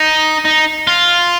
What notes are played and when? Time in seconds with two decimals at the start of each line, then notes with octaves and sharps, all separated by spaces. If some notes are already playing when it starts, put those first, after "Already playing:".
Already playing: D#4
0.45 D#4
0.87 F4